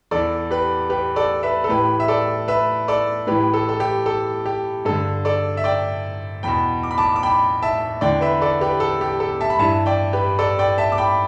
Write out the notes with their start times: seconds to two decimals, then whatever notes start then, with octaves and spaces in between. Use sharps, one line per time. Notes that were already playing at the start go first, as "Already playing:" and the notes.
0.11 E2 E3 A4 D5
0.51 G4 B4
0.90 G4 B4
1.16 A4 D5
1.43 B4 E5
1.64 A4
1.69 A2 E3 G4 B4
2.00 E5
2.08 A4 D5
2.48 B4 E5
2.88 A4 D5
3.27 A2 E3 G4 B4
3.54 A4
3.69 A4
3.80 G4
4.06 A4
4.46 G4
4.85 G2 D3 A4
5.25 A4 D5
5.57 E5
5.64 D5 G5
6.43 E2 B2 G5 B5
6.83 D6
6.91 B5
6.98 A5 D6
7.16 D6
7.23 G5 B5
7.62 E5 A5
8.01 E2 D3 D5 G5
8.21 B4 E5
8.41 A4 D5
8.61 G4 B4
8.80 A4
9.01 G4
9.20 A4
9.41 E5 A5
9.50 B5
9.59 G2 E3 E5 A5
9.86 D5 G5
10.13 G4 B4
10.39 A4 D5
10.59 D5 G5
10.78 E5 A5
10.92 D6
10.98 G5 B5